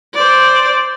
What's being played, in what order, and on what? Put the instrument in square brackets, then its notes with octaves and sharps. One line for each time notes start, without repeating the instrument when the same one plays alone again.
[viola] C5 D5